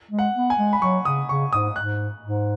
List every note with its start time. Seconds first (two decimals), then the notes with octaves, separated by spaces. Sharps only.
0.11 G#3
0.19 F#5
0.35 B3
0.50 G#5
0.58 G#3
0.73 B5
0.82 F#3 C#6
1.05 C#3 D#6
1.29 C#3 C#6
1.53 G#2 D#6
1.76 G#2 F#6
2.23 G#2